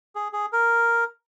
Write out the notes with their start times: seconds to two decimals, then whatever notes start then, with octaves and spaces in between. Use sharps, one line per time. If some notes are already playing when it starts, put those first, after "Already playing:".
0.15 G#4
0.33 G#4
0.53 A#4